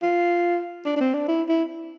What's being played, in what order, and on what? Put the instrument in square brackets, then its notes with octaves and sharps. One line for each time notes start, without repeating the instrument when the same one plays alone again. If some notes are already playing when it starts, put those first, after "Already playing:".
[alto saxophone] F4
D4
D4
C4
D4
E4
E4